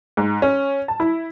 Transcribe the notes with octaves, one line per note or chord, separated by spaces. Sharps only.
G#2
C#4
A5
E4